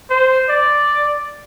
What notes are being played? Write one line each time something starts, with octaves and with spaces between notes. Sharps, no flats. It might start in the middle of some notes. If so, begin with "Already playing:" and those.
C5
D5